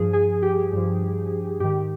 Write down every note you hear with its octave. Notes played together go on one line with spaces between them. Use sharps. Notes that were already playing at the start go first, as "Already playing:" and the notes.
Already playing: G2 F3 G#4
G#4
G4
G2 F3
G#2 D#3 G4